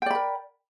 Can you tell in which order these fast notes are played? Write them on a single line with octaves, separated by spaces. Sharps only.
G5 D5 B5 A#4